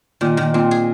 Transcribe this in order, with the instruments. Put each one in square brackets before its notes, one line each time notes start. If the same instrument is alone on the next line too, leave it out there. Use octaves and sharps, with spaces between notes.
[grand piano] A#2 [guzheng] D#3
[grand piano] A#2 [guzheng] D#3
[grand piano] A#2 [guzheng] C4
[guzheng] G#4